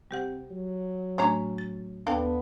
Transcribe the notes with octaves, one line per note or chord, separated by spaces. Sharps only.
C3 G3 G4 F#5
F#3
A2 A3 C#4 D4 C#5 A#5
A6
D#2 D3 B3 D4 F5 G5